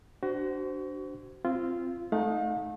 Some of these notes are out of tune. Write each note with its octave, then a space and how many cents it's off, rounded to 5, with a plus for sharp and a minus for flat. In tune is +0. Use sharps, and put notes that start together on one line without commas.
D4 +0 F#4 +30 C5 -20
C4 +0 F4 -15
A3 -15 D#4 +0 F5 +45